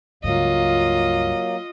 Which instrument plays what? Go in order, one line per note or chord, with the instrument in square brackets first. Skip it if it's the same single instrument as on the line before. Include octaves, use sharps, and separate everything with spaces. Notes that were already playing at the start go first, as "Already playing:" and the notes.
[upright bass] C#2 G2 [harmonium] F#3 A#3 [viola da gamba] F4 D#5